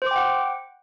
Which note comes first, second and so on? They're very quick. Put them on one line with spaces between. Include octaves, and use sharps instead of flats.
C5 D6 G5 F#5